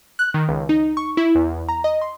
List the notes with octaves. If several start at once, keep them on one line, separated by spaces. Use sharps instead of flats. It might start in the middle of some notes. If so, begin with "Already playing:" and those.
F#6
D#3
C#2
D#4
C#6
E4
E2
A#5
D#5
C6